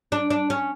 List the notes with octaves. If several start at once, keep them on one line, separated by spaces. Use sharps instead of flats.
D4
D4
C#4